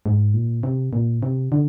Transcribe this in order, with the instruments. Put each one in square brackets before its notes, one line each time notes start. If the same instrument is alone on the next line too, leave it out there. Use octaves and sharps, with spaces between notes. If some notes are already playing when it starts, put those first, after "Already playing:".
[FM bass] G#2
A#2
C3
A#2
C3
D3